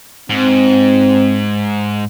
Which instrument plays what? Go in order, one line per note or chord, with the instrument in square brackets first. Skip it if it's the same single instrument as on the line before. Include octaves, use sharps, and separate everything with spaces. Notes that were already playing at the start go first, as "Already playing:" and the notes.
[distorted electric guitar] G#2 [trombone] C4